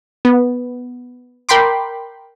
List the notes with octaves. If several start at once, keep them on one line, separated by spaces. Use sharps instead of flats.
B3
A#4 G5 B5 C6 D6